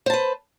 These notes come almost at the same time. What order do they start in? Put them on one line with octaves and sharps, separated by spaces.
C5 A5 B4